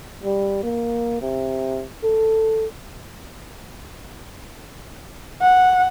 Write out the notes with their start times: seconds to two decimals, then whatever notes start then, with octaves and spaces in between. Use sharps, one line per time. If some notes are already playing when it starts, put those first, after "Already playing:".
0.23 G3
0.63 A#3
1.21 C3
2.04 A4
5.42 F#5